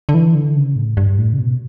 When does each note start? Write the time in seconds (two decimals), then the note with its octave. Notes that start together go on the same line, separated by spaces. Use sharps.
0.09 D3
0.14 E3
0.35 D3
0.56 C#3
0.76 A2
0.97 G2
1.18 A2
1.33 C#3
1.39 B2